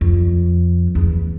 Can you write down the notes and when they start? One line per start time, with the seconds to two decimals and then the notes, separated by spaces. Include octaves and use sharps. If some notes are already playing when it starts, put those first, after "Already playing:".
0.01 F2
0.95 E2